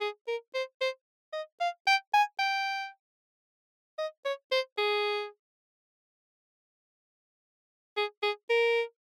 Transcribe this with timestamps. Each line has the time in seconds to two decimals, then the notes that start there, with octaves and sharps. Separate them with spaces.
0.01 G#4
0.28 A#4
0.54 C5
0.81 C5
1.33 D#5
1.60 F5
1.87 G5
2.14 G#5
2.39 G5
3.98 D#5
4.25 C#5
4.52 C5
4.78 G#4
7.97 G#4
8.23 G#4
8.50 A#4